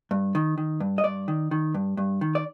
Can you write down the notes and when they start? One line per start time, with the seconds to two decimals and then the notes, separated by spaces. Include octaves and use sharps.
0.11 G2
0.35 D#3
0.58 D#3
0.80 G2
0.98 D#5
1.04 G2 D5
1.28 D#3
1.51 D#3
1.74 G2
1.97 G2
2.21 D#3
2.35 D5